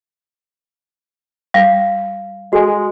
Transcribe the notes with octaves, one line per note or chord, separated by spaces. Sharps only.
G3 F5
G#3 F#4 A4 G#5